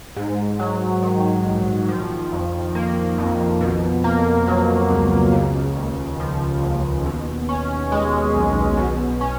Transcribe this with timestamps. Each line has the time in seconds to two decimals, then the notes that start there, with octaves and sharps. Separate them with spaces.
0.16 G#2
0.59 F#3
1.03 D#3
1.45 A#1
1.89 F3
2.32 F2
2.75 A#3
3.18 F2
3.61 B2
4.04 A#3
4.47 F#3
4.90 C#2
5.33 C#3
5.77 D#2
6.20 F3
6.63 D#2
7.06 B2
7.49 C#4
7.92 G#3
8.35 B1
8.77 B2
9.21 C#4